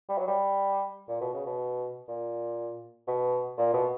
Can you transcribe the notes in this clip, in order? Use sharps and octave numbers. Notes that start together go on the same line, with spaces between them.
G3
F#3
G3
A#2
B2
C#3
B2
A#2
B2
A#2
B2